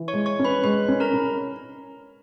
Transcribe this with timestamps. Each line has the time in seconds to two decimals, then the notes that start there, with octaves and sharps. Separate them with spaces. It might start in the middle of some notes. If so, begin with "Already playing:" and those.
Already playing: E3
0.08 C#5 C#6
0.14 G#3
0.26 C#5 C#6
0.39 C#4
0.45 B4 B5
0.64 G#3 B4 B5
0.88 C#4
1.00 A#4 A#5
1.14 C#4